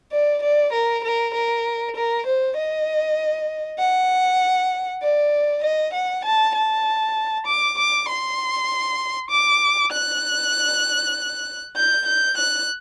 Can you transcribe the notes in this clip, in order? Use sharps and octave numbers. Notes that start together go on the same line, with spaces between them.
D5
D5
A#4
A#4
A#4
A#4
C5
D#5
F#5
D5
D#5
F#5
A5
A5
D6
D6
C6
D6
F#6
G6
G6
F#6